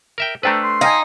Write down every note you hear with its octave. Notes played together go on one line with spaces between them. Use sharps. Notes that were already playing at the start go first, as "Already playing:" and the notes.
A#4 E5 G5
A3 D4 A4 B4 C5 G5 A#5
C6
D#4 F5 G5 G#5